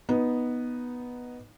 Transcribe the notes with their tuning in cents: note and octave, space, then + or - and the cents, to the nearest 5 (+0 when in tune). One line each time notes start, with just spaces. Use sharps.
B3 -5 D#4 +0